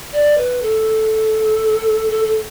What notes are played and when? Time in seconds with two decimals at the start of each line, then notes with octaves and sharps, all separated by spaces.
0.13 D5
0.38 B4
0.62 A4
2.11 A4
2.25 A4